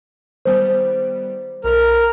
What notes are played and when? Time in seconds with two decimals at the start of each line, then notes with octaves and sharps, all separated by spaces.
0.45 D#3 G3 B3 C5
1.64 B1 A#4